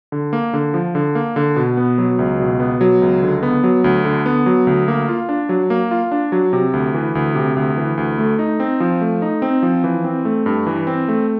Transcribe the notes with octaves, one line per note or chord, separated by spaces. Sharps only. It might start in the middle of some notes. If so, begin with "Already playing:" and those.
D3
A#3
D3
F3
D3
A#3
D3
B2
B3
F#3
C#2
B2
B3
F#3
C#2
D3
B3
F#3
D2
D3
B3
F#3
D2
A#3
F4
D4
F#3
A#3
F4
D4
F#3
C3
D2
E3
D2
C3
D2
E3
D2
A3
D#4
C4
F3
A3
D#4
C4
F3
E3
C4
A3
G2
E3
C4
A3